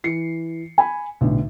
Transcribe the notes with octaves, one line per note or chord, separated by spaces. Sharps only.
E3 C7 C#7
G#5 B5
B1 A2 D3